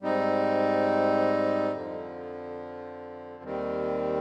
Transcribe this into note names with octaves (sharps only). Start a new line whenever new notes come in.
G#2 G3 C4 D#4
F2 D3 F3
D#2 D#3 G3 C4